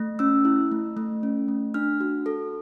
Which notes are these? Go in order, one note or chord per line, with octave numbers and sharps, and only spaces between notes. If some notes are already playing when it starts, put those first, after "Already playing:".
Already playing: A3
C#4 E6
E4
A3
A3
C#4
A3
D4 F6
F#4
A4